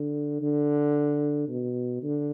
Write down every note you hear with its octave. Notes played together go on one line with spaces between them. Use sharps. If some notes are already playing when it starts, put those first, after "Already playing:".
Already playing: D3
D3
B2
D3